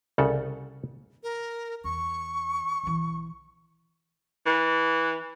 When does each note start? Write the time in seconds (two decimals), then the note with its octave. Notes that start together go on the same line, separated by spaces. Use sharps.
0.18 C2 C#3 A4 F#5
1.23 A#4
1.84 E2 C#6
2.83 B1 E3
4.46 E3